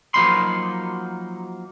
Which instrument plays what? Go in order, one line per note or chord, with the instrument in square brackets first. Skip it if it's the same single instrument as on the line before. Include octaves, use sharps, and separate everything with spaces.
[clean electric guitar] F3 F#3 A#3 D#4 B5 C6